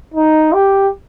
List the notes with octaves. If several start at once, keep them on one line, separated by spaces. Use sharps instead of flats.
D#4
G4